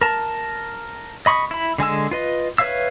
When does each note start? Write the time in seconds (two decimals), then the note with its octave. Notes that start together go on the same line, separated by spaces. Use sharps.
0.01 A#4 A5
1.26 D#5 B5 C#6 D#6
1.51 E4 B5
1.78 D3 G#3 G#5 E6
2.11 F4 B4 D#5
2.58 B4 C#5 E5 F5 E6